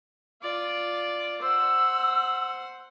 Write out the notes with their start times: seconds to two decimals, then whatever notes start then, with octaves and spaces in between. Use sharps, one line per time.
0.43 F4 D5
1.42 C5 F#5 E6